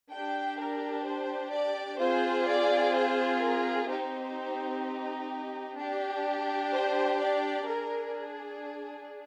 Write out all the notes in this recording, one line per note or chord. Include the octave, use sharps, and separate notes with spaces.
D4 G4 G5
A#4
C5
D5
C4 F4 G#4 C5
D5
C5
A#4
C4 D#4 G4 C5
D4 G4
C5
D5
D4 G#4 A#4